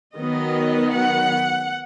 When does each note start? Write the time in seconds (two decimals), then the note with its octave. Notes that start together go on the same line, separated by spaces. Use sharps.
0.17 D#3 F#3 B3 D#5
0.92 F#5